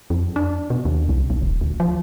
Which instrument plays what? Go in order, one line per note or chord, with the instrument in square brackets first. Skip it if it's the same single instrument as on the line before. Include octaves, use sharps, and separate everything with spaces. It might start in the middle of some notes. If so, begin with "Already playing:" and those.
[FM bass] F2
D4
B2
D#2
C2
B1
D#1
D2
F3